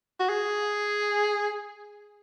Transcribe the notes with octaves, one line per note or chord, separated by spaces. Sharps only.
F#4
G#4